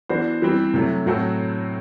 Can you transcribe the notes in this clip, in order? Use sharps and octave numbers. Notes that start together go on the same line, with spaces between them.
E3 B3 D4 F#4 C5
E3 G3 C4
C3 F#3 A3
A2 F#3 C4 F#4 A4